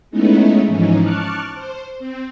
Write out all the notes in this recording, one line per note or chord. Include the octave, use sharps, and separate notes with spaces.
G#3 A3 B3 C#4 D#4 E4
G#2 E3 F3 C#4 D#4
A5 C#6 D6 F6 F#6
C5
C4